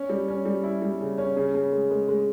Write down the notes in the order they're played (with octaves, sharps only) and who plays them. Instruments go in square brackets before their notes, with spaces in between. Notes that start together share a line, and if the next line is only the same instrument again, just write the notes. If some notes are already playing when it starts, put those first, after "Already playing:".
Already playing: [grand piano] C#4
G3
C#4
G3
E4
G3
C#3
C#4
C#3
C#3
G#3
G#3
G#3